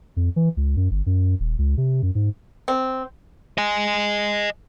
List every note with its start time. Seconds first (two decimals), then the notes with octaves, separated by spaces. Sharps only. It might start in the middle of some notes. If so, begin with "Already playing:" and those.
0.17 F2
0.36 E3
0.57 C#2
0.77 F#2
0.91 G1
1.06 F#2
1.40 D#1
1.58 C#2
1.77 C3
2.03 F#2
2.15 G#2
2.68 C4
3.58 D#5 G#5